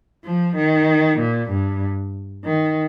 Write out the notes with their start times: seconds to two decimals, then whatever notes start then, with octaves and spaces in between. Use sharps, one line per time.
0.24 F3
0.56 D#3
1.19 A#2
1.50 G2
2.44 D#3